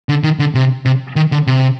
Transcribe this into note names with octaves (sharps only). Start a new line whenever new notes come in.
D3
D#3
D3
C3
C3
D#3
D3
C3